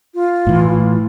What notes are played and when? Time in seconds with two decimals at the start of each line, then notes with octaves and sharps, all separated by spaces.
0.14 F4
0.47 A2 E3